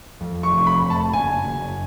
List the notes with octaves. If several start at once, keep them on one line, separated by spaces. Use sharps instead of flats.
F2
C#6
F1
C#6
B5
F1
A5
F#1 G#5
F#1